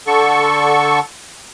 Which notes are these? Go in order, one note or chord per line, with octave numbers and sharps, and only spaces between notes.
D3 A4 C#6